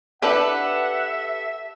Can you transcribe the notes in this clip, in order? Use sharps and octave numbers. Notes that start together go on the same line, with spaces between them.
D3 D4 E4 G4 A4 B4 E5 F#5